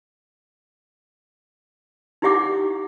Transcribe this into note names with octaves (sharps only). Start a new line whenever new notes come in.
D#4 E4 G4 E5 F#5 D6